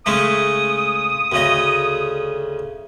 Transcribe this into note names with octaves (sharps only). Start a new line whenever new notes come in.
C#3 G#3 A3 D#6
D2 C#3 D#5